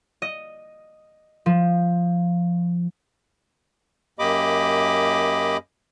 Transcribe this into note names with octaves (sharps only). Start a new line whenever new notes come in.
D#5
F3
F#2 A#3 G4 D#5 B5 D6